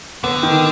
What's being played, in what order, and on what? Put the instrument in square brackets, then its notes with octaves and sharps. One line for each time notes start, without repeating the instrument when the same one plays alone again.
[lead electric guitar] D3 [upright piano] B3
[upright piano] D#3